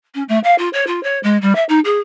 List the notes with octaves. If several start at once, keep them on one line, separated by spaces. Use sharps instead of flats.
C#4
A3
F5
F4
C#5
F4
C#5
G#3
G3
E5
D#4
G#4